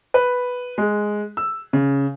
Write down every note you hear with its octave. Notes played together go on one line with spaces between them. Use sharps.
B4
G#3
E6
C#3